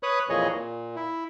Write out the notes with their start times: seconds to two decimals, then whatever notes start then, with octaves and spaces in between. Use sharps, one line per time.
0.03 B4 C#5 D#6 F#6
0.29 F2 A#2 E3 G#4 C#5 D#5
0.51 A#2
0.96 E4